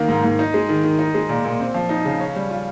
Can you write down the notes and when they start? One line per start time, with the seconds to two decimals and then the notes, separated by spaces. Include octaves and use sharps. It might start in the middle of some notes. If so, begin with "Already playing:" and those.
Already playing: D#3 A#3
0.09 G#2
0.24 G#2
0.39 D#4
0.54 G#3
0.69 D#3
0.84 D#3
0.99 D#4
1.14 G#3
1.29 A#2
1.45 A#2
1.60 C4
1.74 F3
1.89 D#4
2.05 C#3
2.20 C#4
2.36 G3
2.50 F4